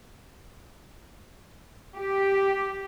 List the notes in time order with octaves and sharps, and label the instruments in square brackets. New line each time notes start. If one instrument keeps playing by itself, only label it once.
[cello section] G4